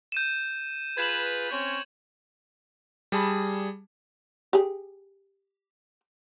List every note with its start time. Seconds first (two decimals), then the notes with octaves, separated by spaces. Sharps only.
0.12 G6 D#7 E7
0.98 F4 G#4 B4 G#6 E7 F#7
1.51 C4 C#4 C#5
3.12 G3 G#4 A5 B5
4.53 G4 G#4